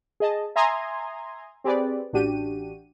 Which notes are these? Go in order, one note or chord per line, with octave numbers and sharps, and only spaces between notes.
G#4 D#5 A5
E5 G#5 A#5 C6 D#6 G#6
C4 G4 G#4 B4 D5
A1 D4 F#4 G4 D#7